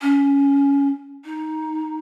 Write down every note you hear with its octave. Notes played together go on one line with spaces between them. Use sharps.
C#4
D#4